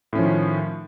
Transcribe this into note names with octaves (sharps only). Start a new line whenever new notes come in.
A2 D#3 F3 C#4